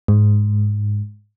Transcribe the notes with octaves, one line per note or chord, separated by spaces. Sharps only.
G#2